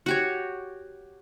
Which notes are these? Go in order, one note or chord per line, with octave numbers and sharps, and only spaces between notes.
F#4 G4 C#5